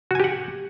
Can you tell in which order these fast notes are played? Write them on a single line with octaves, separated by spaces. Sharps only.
F#4 G#5 G4 F#5